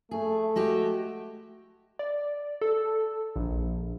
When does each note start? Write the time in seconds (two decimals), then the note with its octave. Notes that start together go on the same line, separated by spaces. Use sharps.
0.11 A3 G#4
0.56 G#3 F#4 G4
1.99 D5
2.61 A4
3.36 A#1